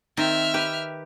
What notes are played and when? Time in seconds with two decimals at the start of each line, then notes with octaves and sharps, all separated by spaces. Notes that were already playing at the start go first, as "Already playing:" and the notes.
0.17 D#3 C4 E5 F6
0.54 G4 B4